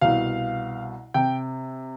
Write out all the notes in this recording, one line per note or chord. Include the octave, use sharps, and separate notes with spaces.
C2 B2 F5
C3 G5